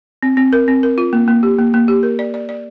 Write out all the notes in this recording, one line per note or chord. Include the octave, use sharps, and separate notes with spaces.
C4
C4
A#4
C4
A#4
F4
A#3
A#3
G4
A#3
A#3
G4
A#4
D5
D5
D5